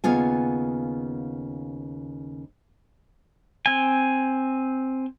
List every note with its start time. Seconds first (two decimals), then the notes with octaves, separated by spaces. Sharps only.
0.04 D#2 C#3 B3 F4 G#5
3.66 C4 G#5